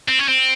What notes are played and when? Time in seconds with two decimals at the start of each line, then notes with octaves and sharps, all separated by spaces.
0.08 C4
0.19 C#4
0.28 C4